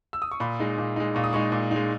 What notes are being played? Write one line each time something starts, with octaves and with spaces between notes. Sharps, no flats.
E6
D#6
C#6
A#2 B5
G#3 D#4
A#2
G#3 D#4
A#2 C#6
D#6
G#3 D#4 C#6
A#2
D#4
G#3